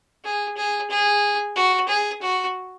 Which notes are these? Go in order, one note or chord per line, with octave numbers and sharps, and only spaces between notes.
G#4
G#4
G#4
F#4
G#4
F#4